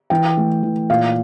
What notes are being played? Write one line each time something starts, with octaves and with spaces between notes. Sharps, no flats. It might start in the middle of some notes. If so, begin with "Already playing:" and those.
E3 G5
A3
E3
A#2 F5